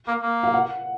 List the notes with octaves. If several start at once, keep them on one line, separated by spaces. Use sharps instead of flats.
A#3
A#3
F5
F#5